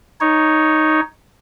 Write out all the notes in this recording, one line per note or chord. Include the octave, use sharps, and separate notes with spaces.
D#4 C#5